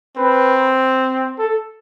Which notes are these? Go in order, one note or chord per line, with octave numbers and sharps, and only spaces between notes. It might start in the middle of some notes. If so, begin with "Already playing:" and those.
C4 B4
A4